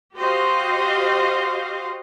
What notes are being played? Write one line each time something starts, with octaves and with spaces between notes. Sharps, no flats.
F#4 G4 C5 D#5 F5